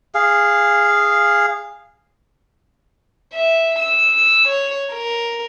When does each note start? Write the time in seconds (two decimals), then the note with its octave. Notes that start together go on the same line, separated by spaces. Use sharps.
0.15 G#4 F5
3.33 E5
3.79 E6
4.48 C#5
4.93 A#4